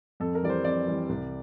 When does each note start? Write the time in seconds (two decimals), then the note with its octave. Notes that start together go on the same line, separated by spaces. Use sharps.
0.20 F2 A4
0.35 A#4
0.43 E3 G3 D5
0.50 C5
0.64 F2 D5
0.87 E3 G3
1.09 C2